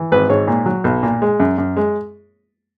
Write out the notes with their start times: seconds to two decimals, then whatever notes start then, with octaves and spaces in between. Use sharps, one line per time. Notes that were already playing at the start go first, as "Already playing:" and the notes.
Already playing: E3
0.12 G#1 B4
0.30 G#2 C#5
0.47 A#2
0.66 F#3
0.84 B1
1.03 A#2
1.22 G#3
1.40 F#2
1.58 F#2
1.77 G#3